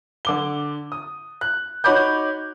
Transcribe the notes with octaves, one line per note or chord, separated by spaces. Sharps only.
D3 D6 G7
D#6
F#6
D#4 F#4 C#5 B5 D6 G6